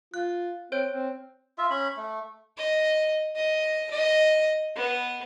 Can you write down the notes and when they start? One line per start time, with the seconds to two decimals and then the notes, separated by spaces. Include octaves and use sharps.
0.14 F4 F#6
0.72 C4 C5 C#5 G6
0.90 C4
1.58 F4 E5
1.70 C#4 B5
1.97 A3
2.57 D#5
3.36 D#5
3.91 D#5
4.76 B3